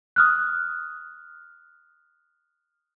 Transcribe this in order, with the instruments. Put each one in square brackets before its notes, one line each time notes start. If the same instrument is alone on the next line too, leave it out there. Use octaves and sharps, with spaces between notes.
[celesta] D#6 F6 F#6